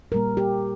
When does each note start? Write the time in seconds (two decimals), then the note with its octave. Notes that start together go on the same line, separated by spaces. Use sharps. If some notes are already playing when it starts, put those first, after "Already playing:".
0.12 A#2 G3 A#3 A#4
0.37 G4